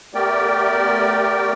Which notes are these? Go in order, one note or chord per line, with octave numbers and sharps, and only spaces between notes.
A3 B3 G4 A#4 D5 G5